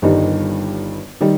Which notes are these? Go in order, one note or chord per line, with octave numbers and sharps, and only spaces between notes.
G1 G2 D#3 G3 D#4
D#3 G3